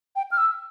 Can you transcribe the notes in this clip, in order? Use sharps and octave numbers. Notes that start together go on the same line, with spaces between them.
G5
F6
E6